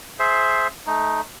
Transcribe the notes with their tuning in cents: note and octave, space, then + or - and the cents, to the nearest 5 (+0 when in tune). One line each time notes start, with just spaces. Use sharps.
G#4 +20 C5 +0 E5 +0
A3 -15 D#4 +0